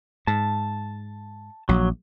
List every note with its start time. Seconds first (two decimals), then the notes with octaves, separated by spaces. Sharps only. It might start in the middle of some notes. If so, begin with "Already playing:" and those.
0.27 G#2 A5
1.69 A#1 F#3